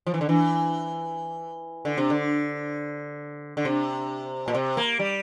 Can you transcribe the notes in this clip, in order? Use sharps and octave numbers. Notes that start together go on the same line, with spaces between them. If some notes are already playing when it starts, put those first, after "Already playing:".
F3
E3
D3
E3
D3
C3
D3
D3
C3
A#2
C3
A#3
G3